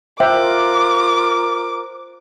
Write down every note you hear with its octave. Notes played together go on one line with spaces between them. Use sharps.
F4 A#4 C5 E5 G5 D6